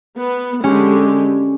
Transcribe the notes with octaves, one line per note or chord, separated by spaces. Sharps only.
B3
D3 G#3 C#4 G4